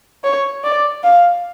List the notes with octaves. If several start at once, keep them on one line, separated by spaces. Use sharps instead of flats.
C#5
D5
F5